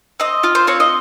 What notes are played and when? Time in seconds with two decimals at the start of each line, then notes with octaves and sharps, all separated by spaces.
0.20 C4 D#5
0.43 F4
0.55 C5
0.67 C4 C#5
0.80 D#5